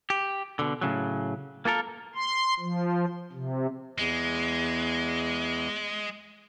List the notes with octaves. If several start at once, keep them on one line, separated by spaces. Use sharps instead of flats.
G4
B2 D3
A2 C#3 F#3
A#3 F4 A4 A#4
C6
F3
C3
E2 G#3